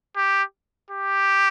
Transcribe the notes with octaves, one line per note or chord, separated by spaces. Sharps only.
G4
G4